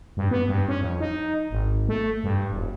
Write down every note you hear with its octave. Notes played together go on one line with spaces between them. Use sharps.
G2
B3
G2
C#4
F2
D#4
G#1
A3
G2
E1